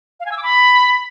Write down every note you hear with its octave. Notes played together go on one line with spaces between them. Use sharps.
F5
G#5
E6
D6
B5